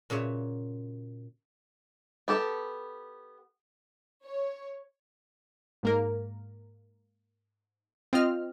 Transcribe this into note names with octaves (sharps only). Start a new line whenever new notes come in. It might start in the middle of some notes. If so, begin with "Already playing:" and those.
A#2 C#3 F#4 C#5 E5
B3 G4 A4
C#5
G#2 A#3 A#4
C4 F4 D#5 F6